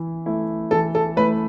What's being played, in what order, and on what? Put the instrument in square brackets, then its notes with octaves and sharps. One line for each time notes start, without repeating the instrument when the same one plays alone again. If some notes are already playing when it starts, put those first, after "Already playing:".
Already playing: [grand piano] E3 E4
A3 E4
[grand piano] E3 [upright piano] A4
[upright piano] A4
[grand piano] A3 E4 [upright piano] B4